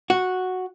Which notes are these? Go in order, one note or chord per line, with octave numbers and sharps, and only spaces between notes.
F#4